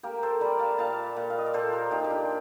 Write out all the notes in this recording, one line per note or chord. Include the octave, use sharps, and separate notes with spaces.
A#3 G4 A#4
A4 C5
G3 A#4 D5
F5 A5
A#2 F5 A5
A#2
F5
D#5
D5
A#2 A4 C5
G4 A#4
A#2 D#4 G4
G4
D4 F4